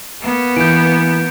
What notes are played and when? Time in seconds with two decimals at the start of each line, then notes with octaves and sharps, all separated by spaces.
0.21 A#3 B3
0.56 E3 G6 D7